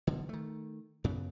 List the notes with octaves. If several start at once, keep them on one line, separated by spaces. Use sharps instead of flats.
E1 B1 D3
D#3 A3
F#2 C#3 B3